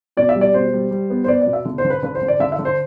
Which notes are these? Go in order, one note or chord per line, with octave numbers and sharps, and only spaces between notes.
B2 D5
E5
G3
D5
B2 C5
G3
G3
B3
C5
B3 D5
D5
B2
E5
D3
C5
D3
B4
D3 B4
C5
D3
D5
D3 E5
E5
D3
C5